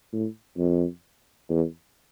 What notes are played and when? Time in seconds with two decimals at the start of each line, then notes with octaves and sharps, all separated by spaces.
0.12 A2
0.58 F2
1.49 E2